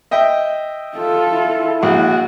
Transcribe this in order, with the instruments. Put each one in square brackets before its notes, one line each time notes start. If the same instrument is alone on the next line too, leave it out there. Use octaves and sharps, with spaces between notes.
[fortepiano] D#5 E5 G5
[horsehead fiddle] F4 A4
[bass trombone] E4
[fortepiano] A#1 [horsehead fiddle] F#4